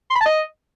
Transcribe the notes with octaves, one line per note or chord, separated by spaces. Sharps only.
C6
B5
A5
D#5